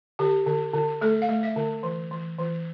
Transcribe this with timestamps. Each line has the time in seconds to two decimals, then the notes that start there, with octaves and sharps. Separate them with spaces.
0.19 D3 G4
0.46 D3
0.74 D3
1.01 A3 A4
1.22 F5
1.29 A3
1.43 E5
1.56 D3
1.83 E3
2.11 E3
2.39 E3